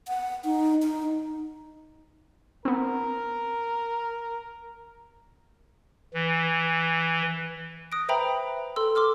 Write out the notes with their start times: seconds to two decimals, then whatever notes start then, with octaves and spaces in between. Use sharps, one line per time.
0.08 F#5
0.45 D#4
0.83 D#4
2.65 B3 C4 A#4
6.14 E3
7.92 D#6 F#6 A#6 D7
8.09 B4 C5 E5 G5 A#5 B5
8.76 A4 C6 E6
8.95 C6 D6 E6 F6